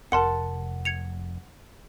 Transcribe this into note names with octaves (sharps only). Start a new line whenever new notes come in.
F1 A#4 F#5 A5 C6 C#7
G#6 C#7 F7